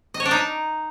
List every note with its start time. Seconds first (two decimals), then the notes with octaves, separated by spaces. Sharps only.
0.14 D#5
0.20 C#5
0.25 D4
0.31 D#4